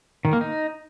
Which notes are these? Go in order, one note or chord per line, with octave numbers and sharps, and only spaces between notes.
D#3
A#3
D#4